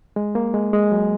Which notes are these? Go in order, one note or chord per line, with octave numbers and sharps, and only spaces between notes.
G#3
A#3
G#3
G#3
F#3